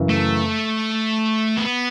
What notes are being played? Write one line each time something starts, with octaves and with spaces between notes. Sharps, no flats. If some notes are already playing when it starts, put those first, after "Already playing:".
Already playing: F#2 C#3 E3
A3
B3